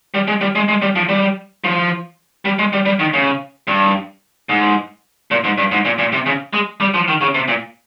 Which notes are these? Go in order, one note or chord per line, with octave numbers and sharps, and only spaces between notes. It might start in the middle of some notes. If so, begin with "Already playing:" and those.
G3
G#3
G3
G#3
G#3
G3
F3
G3
F3
G3
G#3
G3
G3
D#3
C#3
G2
G#2
A#2
G#2
G2
G#2
A#2
A#2
C3
C#3
G#3
G3
F3
D#3
C#3
C3
A#2